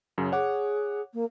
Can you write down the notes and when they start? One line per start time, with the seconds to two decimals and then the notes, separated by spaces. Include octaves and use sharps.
0.18 F#2 C#3
0.32 G#4 C#5 F#5 D6
1.13 A#3